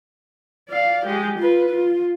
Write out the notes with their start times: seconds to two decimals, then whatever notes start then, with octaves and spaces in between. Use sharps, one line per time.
0.69 D5 F5
1.06 G#3 G4
1.39 F4 B4
1.69 F4